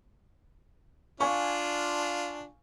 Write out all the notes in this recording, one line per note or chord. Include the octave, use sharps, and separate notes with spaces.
D4 F4 F5 G#5 C#6